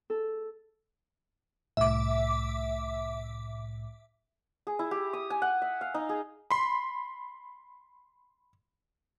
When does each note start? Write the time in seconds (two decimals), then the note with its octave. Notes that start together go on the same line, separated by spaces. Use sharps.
0.10 A4
1.77 C2 A2 E5 D6
4.67 G#4
4.79 E4
4.91 G4
5.13 D#6
5.30 G#5
5.42 F#5
5.62 E5
5.81 F5
5.94 D#4
6.09 G#4
6.51 B5 C6